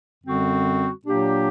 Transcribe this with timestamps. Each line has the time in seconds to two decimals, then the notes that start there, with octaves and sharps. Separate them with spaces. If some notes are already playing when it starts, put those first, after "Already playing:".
0.24 F#2 D3 G3 C4 F#4
1.06 A#2 F#3 A#3 D4 G4